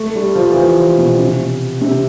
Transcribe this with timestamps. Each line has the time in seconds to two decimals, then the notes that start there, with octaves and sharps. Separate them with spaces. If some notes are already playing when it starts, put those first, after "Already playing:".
Already playing: A3
0.16 G3
0.35 F3
0.50 E3
0.56 F3
0.98 B2
1.18 C3
1.81 C3